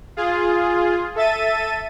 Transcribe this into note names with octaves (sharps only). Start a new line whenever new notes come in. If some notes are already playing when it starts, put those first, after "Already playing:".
F4 G#4
A4 E5 A6 D#7